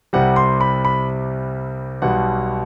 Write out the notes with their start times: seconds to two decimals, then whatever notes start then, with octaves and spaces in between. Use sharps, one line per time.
0.13 C2 C3 G3 F#5
0.36 C6
0.61 B5
0.85 B5
2.02 B1 B2 G3 F#5